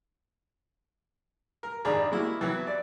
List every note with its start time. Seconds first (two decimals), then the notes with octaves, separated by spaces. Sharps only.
1.63 A#4
1.85 G#1 D4 G#4 A#5 B5
2.12 G#3 A#3 E4 F#4
2.41 E3 F#3 B3
2.67 D5